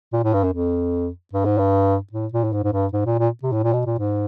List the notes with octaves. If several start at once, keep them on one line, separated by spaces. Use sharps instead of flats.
A#2
A2
G2
F#2
F2
G2
G#2
G2
A2
A#2
A2
G#2
G#2
G2
G#2
A#2
A#2
C3
A2
A#2
B2
A#2
G#2